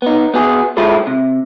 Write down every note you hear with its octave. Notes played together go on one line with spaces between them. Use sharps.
B3 D#4
B3 F#4 G#4
G#3 E4 F4 G#4 A4
C3